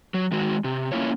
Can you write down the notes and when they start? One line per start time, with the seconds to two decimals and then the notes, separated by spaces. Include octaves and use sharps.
0.14 F#3
0.32 D#3 G#3 F#4
0.64 C3
0.92 A3 A#3 C#4 E4 F4 C#5